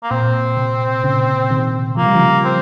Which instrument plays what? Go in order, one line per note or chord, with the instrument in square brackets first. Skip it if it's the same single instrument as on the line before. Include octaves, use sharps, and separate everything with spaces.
[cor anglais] A#3
[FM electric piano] A#2 [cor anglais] C4
[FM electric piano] C3
A#2 C#3
C3 D#3
[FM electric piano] F3 [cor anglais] A#3
[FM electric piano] G3
C#3 F3
[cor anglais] C4